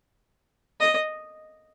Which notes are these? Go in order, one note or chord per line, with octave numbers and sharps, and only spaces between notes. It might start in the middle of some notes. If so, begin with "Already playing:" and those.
D#5